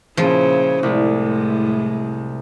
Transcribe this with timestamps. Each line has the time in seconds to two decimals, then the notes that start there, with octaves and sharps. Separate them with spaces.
0.17 A#2 C#3 F3 E4
0.83 C2 A2 G#3